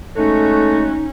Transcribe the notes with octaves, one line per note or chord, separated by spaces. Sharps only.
G#3 A3 C#4 D#4 F#4 A4